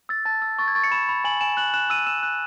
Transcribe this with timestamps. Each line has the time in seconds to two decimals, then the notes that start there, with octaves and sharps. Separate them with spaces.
0.09 E6 A6
0.25 A5 A6
0.42 E6
0.59 C#6 A6
0.68 G#6
0.75 C#6 A6
0.84 C#7
0.91 B5 E7
1.09 B5
1.24 G#5 F#7
1.41 G#5 E7
1.57 F#6 F#7
1.74 F#6 E7
1.90 E6 D#7
2.06 E6 E7
2.23 F#6